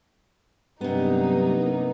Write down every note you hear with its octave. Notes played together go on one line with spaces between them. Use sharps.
G2 C3 F#3 A#3 B3 D#4